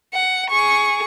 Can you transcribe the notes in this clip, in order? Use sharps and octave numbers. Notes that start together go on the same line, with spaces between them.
F#5
G#4 C#6